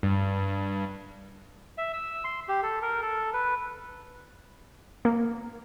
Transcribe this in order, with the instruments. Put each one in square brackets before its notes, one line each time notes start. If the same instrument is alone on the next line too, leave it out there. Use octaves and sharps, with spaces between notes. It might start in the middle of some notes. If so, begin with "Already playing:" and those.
[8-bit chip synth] G2
[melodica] E5
E6
C6
G4
A4
A#4
A4
B4
[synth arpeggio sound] A#3